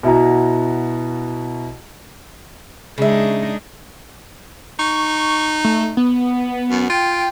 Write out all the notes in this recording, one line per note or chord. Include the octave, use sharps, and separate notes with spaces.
B2 E4 F#4 A#5
C#3 G#3 D4 D#4 E5
D#4 C#6
A3
B3
F#2
F4 G5